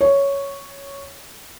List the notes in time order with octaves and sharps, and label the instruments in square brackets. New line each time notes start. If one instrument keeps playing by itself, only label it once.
[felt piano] C#5